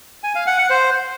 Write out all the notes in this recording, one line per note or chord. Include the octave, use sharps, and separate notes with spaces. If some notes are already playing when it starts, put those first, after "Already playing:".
G#5
F5
F#5
F#5
C5